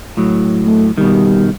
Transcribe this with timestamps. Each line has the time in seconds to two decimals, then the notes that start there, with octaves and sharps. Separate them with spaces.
0.17 A2 F#3
0.66 A3
0.98 B2 D#3 G3